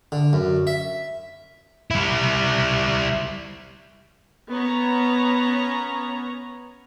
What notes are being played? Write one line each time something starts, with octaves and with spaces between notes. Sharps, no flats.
D3
F#2
E5
G3 E4
B3 C#4 C#5 A#5